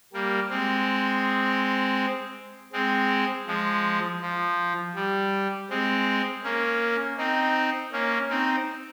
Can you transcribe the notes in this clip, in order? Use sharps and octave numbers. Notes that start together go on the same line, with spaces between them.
G3 A#3
G#3 C4
G#3 C4
F3 G#3
F3
G3
G#3 C4
A#3 C#4
C4 D#4
A#3 C#4
C4 D#4